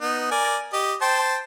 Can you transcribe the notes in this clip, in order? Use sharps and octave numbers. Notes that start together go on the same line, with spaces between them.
B3 D#4
A#4 D5 G#5
G4 D#5
C5 G5 A5